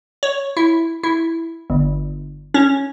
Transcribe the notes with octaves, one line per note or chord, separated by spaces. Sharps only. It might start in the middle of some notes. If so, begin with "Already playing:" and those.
C#5
E4
E4
G1
C#4